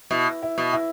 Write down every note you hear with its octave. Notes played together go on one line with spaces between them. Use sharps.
B2 E4
E4
B2
E4